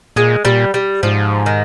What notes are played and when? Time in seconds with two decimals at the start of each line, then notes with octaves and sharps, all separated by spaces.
0.16 A#2 G#3
0.45 A#2 G3
0.74 G3
1.03 G#2 F3
1.46 D#3